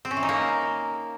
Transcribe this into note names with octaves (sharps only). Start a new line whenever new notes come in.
C4
C#4
E3
D#4
A#3